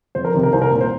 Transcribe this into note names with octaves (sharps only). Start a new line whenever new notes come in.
F2 C5
A#4
C3 D#3
A#4
C2 C5
A#4
A#2
C5